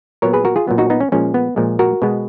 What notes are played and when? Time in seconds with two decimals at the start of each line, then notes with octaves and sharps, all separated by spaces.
0.22 A#2 F#3 B3 A#4 C#5
0.33 G#4 B4
0.45 F#4 A#4
0.56 F4 G#4
0.67 A#2 F#3 B3
0.78 D#4 F#4
0.90 B3 D#4
1.00 C#4
1.12 A#2 F3 G#3 C#4
1.34 B3
1.56 A#2 F3 G#3
1.79 F#4 A#4
2.02 B2 G#3 B3